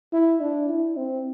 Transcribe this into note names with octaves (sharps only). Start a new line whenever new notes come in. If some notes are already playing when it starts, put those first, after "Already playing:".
E4
D4
E4
C4